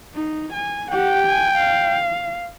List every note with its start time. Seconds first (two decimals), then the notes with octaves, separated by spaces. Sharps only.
0.14 D#4
0.53 G#5
0.91 G4 F#5 G5
1.25 G#5
1.59 F5